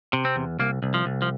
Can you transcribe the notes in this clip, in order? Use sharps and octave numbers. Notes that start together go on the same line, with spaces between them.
C3
C4
E2
C2 A#3
C2
F3
C2
F3